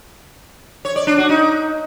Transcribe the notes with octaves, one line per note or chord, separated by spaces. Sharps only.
C#5
D5
D4
F#4
D#4